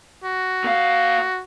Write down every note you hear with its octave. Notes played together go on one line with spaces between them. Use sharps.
F#4
A#2 F5